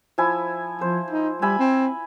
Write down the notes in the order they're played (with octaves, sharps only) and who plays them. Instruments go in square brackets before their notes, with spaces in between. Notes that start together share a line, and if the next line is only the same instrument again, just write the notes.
[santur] F3 E4 G#5
[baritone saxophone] F3 [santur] C5
[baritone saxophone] D#4
[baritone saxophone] G3 [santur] E5 G#5 B5
[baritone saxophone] C4